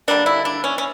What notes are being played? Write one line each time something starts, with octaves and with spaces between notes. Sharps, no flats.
D3 G3 A#3 D4
E4
D4
C#4
C#4